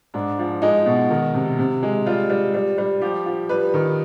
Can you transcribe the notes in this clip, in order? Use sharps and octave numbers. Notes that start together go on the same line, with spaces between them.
G#2 D4
F3
G#3 D#4
B2
D#3
C3
C3
G#3
G3 F4
G3
G3
G3
F3 G4
F3
G3 B4
D#3